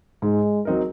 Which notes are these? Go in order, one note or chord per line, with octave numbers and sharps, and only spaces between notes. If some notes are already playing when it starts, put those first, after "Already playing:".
G#2 G#3
F#3 C4 D#4 A#4